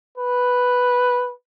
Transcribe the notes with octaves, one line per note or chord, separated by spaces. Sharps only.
B4